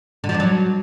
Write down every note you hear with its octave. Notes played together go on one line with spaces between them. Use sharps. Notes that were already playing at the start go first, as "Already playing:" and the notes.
D3
F3
D4
F#3